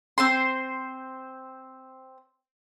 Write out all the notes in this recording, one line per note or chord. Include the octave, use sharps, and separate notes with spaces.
C4 C5 C6